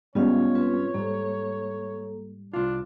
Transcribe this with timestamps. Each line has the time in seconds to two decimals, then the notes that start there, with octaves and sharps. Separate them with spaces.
0.15 G#2 G3 B3 C#4 F4 C#5 D#5 F5
0.55 C4 F4 B4
0.94 G#2 G3 A#3 A4
2.53 C2 D4 F4